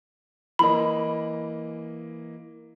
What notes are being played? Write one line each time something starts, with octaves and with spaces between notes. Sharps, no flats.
E3 A#3 D#5 B5